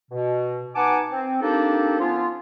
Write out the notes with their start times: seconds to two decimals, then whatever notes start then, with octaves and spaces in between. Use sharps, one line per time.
0.11 B2
0.75 B3 D#4 F#5 G#5 A5 D6
1.11 C4
1.42 A#3 C4 D4 D#4 G4 A4
2.00 F3 B3 C#4 F4